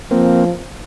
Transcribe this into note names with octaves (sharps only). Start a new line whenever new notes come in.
F3 A#3 C4